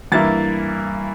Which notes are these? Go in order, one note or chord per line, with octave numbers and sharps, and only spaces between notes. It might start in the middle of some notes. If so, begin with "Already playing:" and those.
G2 E3 A#3 E4 A6